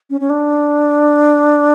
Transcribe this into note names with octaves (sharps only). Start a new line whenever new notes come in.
C#4
C#4
D4